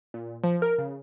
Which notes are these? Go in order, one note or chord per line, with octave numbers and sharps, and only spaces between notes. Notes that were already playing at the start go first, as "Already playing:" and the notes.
A#2
F3
A#4
C#3